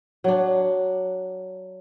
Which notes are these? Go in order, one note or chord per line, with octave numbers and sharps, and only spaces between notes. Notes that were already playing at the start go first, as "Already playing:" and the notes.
F#3 D4